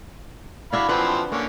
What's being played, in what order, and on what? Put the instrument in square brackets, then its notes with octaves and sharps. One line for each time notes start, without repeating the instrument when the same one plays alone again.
[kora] D4 E4 F#4 [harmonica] F5 B5
[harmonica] E3 F3 C4 [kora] B4 F#5
[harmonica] D3 C#4 [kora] A#3